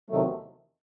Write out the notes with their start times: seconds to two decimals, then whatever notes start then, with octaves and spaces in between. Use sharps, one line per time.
0.09 E2 C3 D#3 F#3 A3